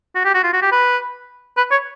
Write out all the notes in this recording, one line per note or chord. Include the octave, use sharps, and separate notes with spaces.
F#4
G4
F#4
F4
F#4
G4
B4
B4
C#5